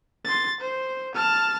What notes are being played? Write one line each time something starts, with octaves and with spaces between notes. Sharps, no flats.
C6 A6
C5
A5 F6